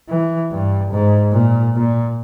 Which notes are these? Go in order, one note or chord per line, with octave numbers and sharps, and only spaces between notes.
E3
G2
G#2
A#2
A#2